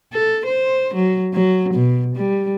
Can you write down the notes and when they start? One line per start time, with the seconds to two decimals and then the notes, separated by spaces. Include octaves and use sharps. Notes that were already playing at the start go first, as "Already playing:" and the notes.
0.13 A4
0.46 C5
0.94 F#3
1.34 F#3
1.74 B2
2.16 G3